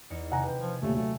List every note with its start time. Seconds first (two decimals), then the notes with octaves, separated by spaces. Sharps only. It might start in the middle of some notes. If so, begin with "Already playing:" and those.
0.10 E2 D#4 C#7
0.32 C3 D#3 F#5 G#5 A#5
0.44 B4 G5
0.61 F3 G#5
0.82 D#2 A#2 A3 G4
0.95 F#3 A3